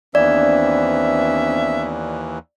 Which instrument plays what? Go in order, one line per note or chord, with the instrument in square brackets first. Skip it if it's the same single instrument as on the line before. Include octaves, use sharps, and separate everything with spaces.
[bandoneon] D#2 E3 [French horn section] B3 C4 D4 [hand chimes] D5 [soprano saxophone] E5